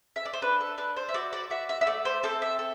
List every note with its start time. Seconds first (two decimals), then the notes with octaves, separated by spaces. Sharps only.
0.16 E5
0.25 D5
0.33 C5
0.42 D4 B4
0.60 A4
0.78 D4 B4
0.97 C5
1.09 E5
1.14 F#4 D5
1.33 D5
1.50 F#4 E5
1.69 E5
1.81 E5
1.87 A3 D5
2.05 C5
2.23 C4 A4
2.42 E5
2.59 A4